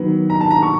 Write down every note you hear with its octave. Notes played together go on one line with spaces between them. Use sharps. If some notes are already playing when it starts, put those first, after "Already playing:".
Already playing: D#3 F#3 B3
A#5
A5
A#5
C#6